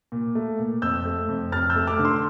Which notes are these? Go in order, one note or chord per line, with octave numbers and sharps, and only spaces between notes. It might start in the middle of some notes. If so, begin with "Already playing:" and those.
A#2
A3
A#2
F2 E6 G6
A3
F2
F2 F6 A6
E6 G6
A3
D6 F6
D3
C6 E6